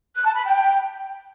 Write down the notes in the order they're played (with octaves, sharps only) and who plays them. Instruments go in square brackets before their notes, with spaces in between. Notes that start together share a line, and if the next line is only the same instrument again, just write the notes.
[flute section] F#6
A5
B5
G5